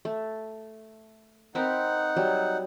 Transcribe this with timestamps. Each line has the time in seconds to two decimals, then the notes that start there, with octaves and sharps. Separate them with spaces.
0.05 A3
1.55 C4 D#4 A#4 B4 F#5
2.16 F#3 G3